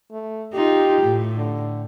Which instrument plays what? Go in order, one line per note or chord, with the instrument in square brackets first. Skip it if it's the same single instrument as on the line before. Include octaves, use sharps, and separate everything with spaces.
[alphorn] A3
[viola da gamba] D#4 F4 [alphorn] G4
[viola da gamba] A2
[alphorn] D3